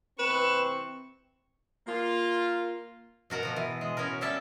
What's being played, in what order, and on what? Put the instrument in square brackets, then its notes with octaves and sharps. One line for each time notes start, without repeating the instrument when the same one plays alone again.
[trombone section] C3 E3 C4 [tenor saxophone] B4 [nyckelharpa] C#6 [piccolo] E7
[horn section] A#3 F4
[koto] B2 F#4 A#4 F#5
B2 F3 B3
E3
G#3
B3 C#4 F#4 A#4
G3 C#4 A4 E5 A5